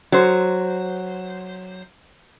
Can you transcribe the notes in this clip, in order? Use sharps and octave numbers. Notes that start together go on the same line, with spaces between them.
F#3 C5